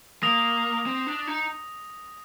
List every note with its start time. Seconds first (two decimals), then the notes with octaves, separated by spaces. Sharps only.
0.23 A#3 D#6 A#6 F7
0.86 C4
1.07 D4
1.27 D#4